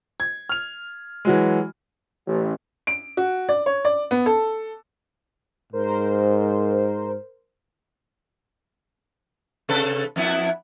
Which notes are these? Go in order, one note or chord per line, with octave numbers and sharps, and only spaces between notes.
G#6
F6 F7
E3 F#3 G#3
A1
D7
F#4
D5
C#5
D5
B3
A4
G#2 A#4 C5
C3 A4 B4
F2 B3 E4